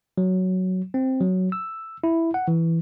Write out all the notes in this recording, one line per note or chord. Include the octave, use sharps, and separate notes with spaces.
F#3
C4
F#3
E6
E4
F#5
E3